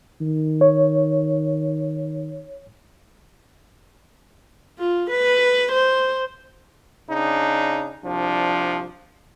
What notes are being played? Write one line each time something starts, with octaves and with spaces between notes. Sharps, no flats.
D#3
C#5
F4
B4
C5
C#3 D4 D#4
C2 F3 D4